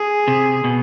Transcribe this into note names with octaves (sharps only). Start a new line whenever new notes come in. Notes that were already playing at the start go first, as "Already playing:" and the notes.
Already playing: G#4
C3
B2